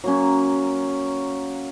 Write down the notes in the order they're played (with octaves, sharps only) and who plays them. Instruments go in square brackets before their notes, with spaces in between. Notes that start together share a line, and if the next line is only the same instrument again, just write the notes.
[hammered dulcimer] F#3 A#3 C#4